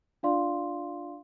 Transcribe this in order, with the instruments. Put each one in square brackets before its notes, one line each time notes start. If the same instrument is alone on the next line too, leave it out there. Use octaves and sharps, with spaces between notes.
[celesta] D4 F4 D5 F5 C6